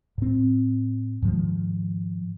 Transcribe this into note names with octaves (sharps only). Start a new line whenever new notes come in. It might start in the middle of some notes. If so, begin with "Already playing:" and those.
A2 C4
G#2 D#3 F3 G#3